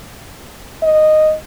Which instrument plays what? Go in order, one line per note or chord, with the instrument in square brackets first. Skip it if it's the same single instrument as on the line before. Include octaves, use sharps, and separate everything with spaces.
[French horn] D#5